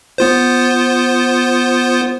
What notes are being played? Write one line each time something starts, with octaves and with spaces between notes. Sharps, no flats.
B3 F4 C5